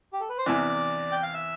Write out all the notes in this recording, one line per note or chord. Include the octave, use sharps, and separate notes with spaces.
G4
A4
B4
C5
E2 C3 E3 D5
G5
F5
E5